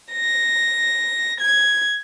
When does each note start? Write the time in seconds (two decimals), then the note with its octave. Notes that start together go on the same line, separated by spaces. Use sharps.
0.12 A#6
1.40 G#6